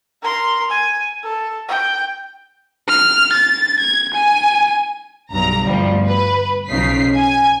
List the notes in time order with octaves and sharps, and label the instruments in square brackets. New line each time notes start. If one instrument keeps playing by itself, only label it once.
[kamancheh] A#4 C6
G#5
A4
G5
[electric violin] F6
A6
G#6
G#5
[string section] B1 G2 A#5
G1 D2 F3 G3
B4
B1 C#3 F3 D#4 B6 C7
G#5